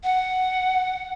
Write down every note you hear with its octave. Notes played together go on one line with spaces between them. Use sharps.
F#5